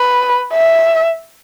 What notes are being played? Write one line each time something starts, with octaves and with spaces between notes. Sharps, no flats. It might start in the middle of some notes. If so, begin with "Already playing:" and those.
Already playing: B4
E5